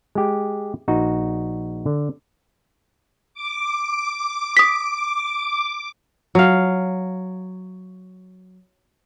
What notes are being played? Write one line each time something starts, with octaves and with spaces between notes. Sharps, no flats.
G#3 G4
A#1 D#4 F#4
D3
D6
D#6 B6
F#3 F5